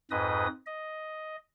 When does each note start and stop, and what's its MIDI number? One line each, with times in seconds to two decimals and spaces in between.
0.11 0.47 41
0.11 0.47 44
0.11 0.47 71
0.11 0.47 75
0.11 0.47 87
0.66 1.36 75